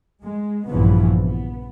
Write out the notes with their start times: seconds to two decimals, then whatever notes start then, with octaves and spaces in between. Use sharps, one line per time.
0.23 G#3
0.67 A#1 G2 C#3 E3 F3 B3
1.23 B3